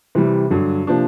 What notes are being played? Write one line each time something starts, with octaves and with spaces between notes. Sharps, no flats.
C3 E3 G3
G2 D3 F#3
C3 F3 A#3 D4